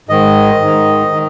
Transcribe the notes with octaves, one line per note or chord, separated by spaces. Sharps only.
G#2 D#3 D#5
G#2 D#3
D#3